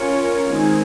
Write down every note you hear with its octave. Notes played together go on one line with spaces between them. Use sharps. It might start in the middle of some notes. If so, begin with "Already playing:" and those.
Already playing: C#4 F4 A#4 C#5
D#3 G#3 C4 D#4 G#4